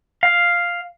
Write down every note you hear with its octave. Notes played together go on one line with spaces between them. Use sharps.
F5